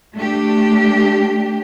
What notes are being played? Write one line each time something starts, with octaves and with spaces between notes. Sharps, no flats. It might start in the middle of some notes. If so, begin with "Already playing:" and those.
A3 D4 G4